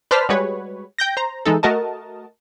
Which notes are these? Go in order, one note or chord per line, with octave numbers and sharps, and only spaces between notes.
B4 C5 D5 A5 F6 B6
G3 G#3 F#4 B4 C#5
G5 G6 A#6
C5 A#5
E3 G#3 D#4 A4
A3 F#4 A#4 D#5 A5